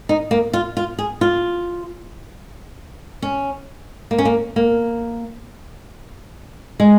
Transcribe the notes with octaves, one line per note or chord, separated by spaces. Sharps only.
D#4
A#3
F4
F4
G#4
F4
C#4
A#3
C#4
A#3
A#3
G#3